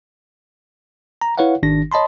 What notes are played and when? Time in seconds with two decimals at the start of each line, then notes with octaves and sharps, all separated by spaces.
1.21 A#5
1.38 E4 B4 C#5 F5 F#5
1.63 G#1 D#3 D4 A#6
1.92 C#5 D#5 A5 B5 C6